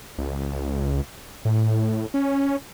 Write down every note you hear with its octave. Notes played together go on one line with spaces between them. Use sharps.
C#2
A2
C#4